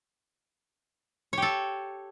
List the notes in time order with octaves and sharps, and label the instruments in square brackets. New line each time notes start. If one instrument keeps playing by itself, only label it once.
[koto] C#5
G4
A4